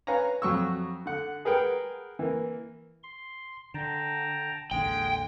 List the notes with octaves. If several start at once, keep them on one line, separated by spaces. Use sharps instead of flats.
B4 C#5 F5 G#5 A#5
F2 F#3 C#6 E6
D3 F#5
G#4 A#4 B4 F#5 G5 A#5
E3 A#3
C6
D3 G5 A5 A#5
A1 D#2 D3 G#3 G5